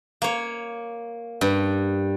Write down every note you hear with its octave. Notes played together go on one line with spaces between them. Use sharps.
A#3 C#5
G2